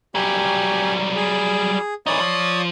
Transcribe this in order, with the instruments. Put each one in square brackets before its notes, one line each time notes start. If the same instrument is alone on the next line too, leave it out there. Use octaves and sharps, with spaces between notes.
[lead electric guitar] F#3 G3 [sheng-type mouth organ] G4 G#5
[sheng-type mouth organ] G#4
[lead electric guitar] E3 D#4 [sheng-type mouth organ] C#5 D5 D#6
[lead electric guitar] F3